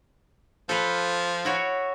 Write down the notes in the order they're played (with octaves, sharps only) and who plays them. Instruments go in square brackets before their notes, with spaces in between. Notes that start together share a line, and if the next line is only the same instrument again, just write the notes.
[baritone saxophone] F3 [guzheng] A4 B4 F5
[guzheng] E4 F#4 C#5